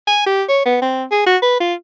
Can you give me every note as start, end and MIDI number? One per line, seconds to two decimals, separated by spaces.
0.07 0.25 80
0.26 0.44 67
0.49 0.61 73
0.65 0.77 59
0.82 1.04 60
1.11 1.25 68
1.26 1.37 66
1.42 1.58 71
1.60 1.74 65